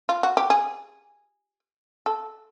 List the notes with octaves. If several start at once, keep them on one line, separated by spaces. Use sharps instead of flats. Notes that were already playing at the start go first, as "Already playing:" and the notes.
F4
F#4
G4
G#4
A4